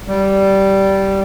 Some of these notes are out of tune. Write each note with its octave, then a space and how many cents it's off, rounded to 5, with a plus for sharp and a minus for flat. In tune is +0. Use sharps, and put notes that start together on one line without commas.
G3 -10